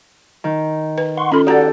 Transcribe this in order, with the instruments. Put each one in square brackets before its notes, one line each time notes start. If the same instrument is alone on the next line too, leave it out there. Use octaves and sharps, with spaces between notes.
[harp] D#3
[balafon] B4
[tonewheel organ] F#5 C6 C#6
[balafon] C#4 F4 A4 [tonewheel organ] B5 C6
[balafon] F#4 A#5 [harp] G4 A4 [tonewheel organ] D5 F#5